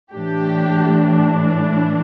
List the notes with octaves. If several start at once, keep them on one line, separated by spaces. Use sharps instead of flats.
A2 E3 A3 D4 G4